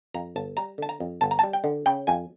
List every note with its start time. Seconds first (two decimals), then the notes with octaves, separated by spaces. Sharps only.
0.14 F2 A#5
0.36 G1 A5
0.57 G3 A#5
0.78 D3 A5
0.89 A#5
1.00 F2
1.21 G1 A5
1.31 A#5
1.39 G3 A5
1.53 G5
1.64 D3
1.86 C#3 G5
2.07 F2 G#5